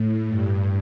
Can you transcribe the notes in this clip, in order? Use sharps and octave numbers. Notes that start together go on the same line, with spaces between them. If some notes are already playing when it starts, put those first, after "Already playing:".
Already playing: A2
G2